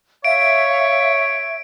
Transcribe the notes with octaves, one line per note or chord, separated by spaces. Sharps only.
C#5 E5 F5 D7